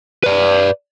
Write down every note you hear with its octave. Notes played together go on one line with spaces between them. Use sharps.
B4 D5